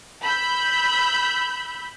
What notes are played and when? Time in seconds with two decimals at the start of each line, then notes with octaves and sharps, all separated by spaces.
0.23 B5 E6 G6